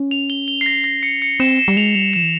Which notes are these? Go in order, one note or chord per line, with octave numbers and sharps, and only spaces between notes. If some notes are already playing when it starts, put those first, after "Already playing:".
Already playing: C#4
F7
G7
G7
C7
A#6
A#6
C#7
C#7
C4 E7
E7
G3
G#3 F7
G3 F7
F3 E7
E3